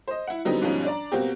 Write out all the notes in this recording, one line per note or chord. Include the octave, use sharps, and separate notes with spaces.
C5 D#5
E4 F#5
D3 F#3 G3 B3 C4 D#4
G#2 B2 F3 G3 C#4 D#4
D4 D5 A#5
B2 A#3 C4 F#4 G4